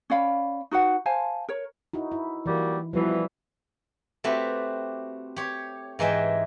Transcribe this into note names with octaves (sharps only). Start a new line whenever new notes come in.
C#4 D5 F5 B5
D#4 F#4 B4 F#5
C5 F5 G#5 A5
A#4 C#5
D#4 E4 F#4
E4
E3 F#3 G3 A#3
B2 E3 F3 G3
A3 C4 F#4 G4 B4
G4 C#5
G#2 E3 G#3 E5 G5